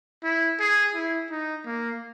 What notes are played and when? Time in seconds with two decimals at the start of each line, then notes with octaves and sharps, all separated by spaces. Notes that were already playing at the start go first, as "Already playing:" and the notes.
0.24 E4
0.60 G#4
0.95 E4
1.31 D#4
1.66 A#3